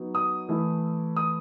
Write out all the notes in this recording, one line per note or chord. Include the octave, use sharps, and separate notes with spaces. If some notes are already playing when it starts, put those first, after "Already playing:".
Already playing: F#3 B3 D#4
D#6
E3 A3 E4
D#6